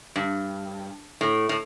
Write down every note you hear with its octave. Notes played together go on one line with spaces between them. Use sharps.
G2
A2
A2